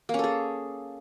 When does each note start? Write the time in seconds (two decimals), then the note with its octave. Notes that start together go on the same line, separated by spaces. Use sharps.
0.09 A#3
0.14 C#4
0.19 A4
0.24 G#4